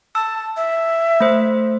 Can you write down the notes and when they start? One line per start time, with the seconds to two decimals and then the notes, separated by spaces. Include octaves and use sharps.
0.15 A5 E6
0.57 E5
1.20 A3 C5